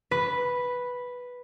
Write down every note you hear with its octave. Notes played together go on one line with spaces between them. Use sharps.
B4